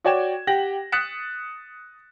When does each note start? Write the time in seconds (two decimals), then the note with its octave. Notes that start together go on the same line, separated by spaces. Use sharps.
0.05 F#4 C#5 D5 G5 G#6 E7
0.47 G4 F#5 G5 A#6 F#7
0.92 D#6 F#6 A6 B6 C#7 E7